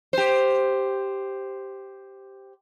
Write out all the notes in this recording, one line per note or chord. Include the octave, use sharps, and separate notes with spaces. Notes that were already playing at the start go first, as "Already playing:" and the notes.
G4 C5